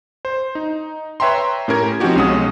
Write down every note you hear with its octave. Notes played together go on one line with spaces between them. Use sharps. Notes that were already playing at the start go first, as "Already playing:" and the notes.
C5
D#4
B4 C#5 E5 G5 A#5 C6
A2 C#4 G4 A#4 G#6
F3 C4 C#4 D#4 F#4 G4
B1 G#3 C#4 F#5 D#6